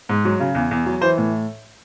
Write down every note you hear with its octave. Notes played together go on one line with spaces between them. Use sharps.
G#2
F#3
C#3
E2
E2
F#3
E3 C5
A2